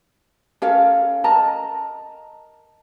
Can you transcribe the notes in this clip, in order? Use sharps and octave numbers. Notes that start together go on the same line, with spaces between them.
C#4 A4 A#4 F5
A#4 D#5 A5 A#5